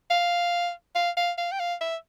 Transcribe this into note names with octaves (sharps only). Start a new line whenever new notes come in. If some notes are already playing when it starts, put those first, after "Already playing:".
F5
F5
F5
F5
G5
F5
E5